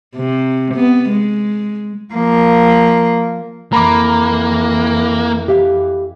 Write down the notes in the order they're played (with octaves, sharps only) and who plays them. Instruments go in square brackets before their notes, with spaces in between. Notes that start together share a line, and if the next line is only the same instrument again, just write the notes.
[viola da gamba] C3
B3
G#3
[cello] F3 A#3
[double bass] F2 E3 [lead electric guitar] A#3 [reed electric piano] A#5 B5 D6
[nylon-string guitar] G4 E5 F5